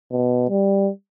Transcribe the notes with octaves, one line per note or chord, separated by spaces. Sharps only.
B2
G3